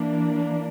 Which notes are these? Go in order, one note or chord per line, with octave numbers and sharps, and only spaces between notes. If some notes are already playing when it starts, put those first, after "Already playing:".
Already playing: E3 A#3 D4